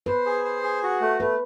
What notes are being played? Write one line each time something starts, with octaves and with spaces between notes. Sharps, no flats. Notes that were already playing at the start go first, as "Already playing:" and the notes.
B4 C5
G#4
C5
G#4
F#4
A3
A3 B4